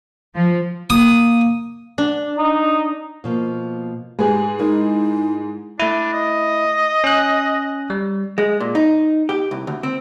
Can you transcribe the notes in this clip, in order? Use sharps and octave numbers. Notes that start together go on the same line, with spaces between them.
F3
A#3 D#6
D4
D#4
B2 F3 A#3
G#2 G4 G#4 B4 G#5
G#3 D#4 E4 A#4
A3 D4 E4
D#5
C#4 F#6
G3
G#3
A#2
D#4
G4
C2
D2
C4